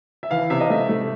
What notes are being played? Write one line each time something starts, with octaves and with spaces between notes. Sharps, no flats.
E5
E3 F5
C3 E5
D#5
A3 E5
A3